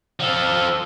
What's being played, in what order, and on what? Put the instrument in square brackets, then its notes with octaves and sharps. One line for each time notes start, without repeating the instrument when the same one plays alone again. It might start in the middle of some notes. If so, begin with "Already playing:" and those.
[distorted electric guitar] F3 A4